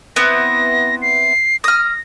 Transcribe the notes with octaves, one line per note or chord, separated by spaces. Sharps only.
B3 C4 E4 A#6
C7
D#6 F6 A#6